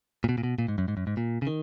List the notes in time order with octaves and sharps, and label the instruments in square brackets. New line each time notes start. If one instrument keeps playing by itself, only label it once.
[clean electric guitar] A#2
B2
A#2
B2
A#2
G#2
F#2
G#2
F#2
G#2
A#2
C#3
D#3